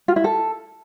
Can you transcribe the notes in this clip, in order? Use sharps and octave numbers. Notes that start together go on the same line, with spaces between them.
F4
E4
A4